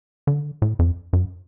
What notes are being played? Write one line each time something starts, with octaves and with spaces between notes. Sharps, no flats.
D3
A2
F2
F#2